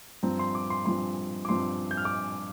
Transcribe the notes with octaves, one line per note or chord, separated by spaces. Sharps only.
G2 F3 C4 A#5
C6
D6
C6
G2 F3 C4 C6
D6
G2 F3 C4 C6
G6
F6
D6